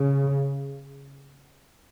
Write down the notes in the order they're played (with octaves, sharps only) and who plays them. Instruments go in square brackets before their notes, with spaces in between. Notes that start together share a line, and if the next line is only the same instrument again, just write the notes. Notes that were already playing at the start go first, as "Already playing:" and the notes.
Already playing: [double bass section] C#3